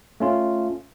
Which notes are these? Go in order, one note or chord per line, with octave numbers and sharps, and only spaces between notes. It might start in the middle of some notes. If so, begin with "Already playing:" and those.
A3 C#4 F4